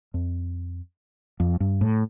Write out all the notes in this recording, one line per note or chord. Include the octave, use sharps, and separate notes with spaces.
F2
F2
G2
A2